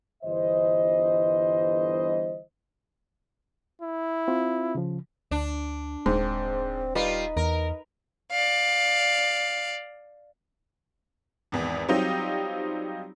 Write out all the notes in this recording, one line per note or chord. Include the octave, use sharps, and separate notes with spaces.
G1 E3 C5 D#5
E4
C4 F4
C#3 F3
D2 D4
D#1 G#2 C4
G3 D#4 F4 B4
E2 A#4
D5 F5
G#1 E2
F#3 G3 C4 D#4 F4 G4